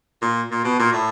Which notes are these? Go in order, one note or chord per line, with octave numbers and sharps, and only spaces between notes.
A#2
A#2
B2
A#2
A2